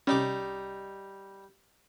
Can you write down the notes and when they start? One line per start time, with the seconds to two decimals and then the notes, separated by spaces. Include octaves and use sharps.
0.07 C2 G3 C#4 D#4 D6